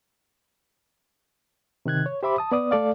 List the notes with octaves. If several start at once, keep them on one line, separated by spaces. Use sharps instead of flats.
C3 D#3 F#6 G#6
C#5
G4 C5 E5 B5 D6
A5 D#6
B3 D5 D#6
A3 A4 D5 F5